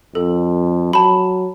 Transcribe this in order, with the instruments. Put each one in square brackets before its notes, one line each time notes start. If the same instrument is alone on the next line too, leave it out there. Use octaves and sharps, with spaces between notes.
[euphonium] F2 [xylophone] A4
[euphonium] F#3 [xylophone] A5 B5